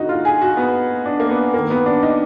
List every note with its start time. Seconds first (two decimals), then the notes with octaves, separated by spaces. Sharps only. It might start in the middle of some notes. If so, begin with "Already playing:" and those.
Already playing: D2 D3 D#4 F#4
0.09 F4
0.25 G#4
0.42 F#4
0.57 B3
1.06 D4
1.20 A#3
1.30 B3
1.54 D#2 D#3 A#3
1.70 B3
1.86 D4
2.03 D#4